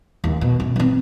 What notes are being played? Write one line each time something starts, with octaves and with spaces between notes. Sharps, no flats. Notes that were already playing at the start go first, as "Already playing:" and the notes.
D#2 C#3
B2
F#2
E3 C4